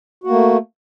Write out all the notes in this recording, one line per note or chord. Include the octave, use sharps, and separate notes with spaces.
A3 A#3 F#4